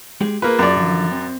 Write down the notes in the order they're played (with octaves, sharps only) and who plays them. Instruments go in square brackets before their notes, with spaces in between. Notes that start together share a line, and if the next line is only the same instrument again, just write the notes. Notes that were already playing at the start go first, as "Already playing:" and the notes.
[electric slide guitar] G#3 G4 G#4
[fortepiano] A#3 B4 [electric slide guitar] F4 G#4
[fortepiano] F#2 D5
[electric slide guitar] D3 E3 F3
C4